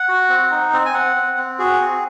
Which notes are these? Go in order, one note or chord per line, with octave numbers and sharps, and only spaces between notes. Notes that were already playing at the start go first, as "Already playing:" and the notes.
Already playing: F#5
F#4
C4
D#4
C4
G#5
C4 F#5
C4
C4
F#4 G#4
C4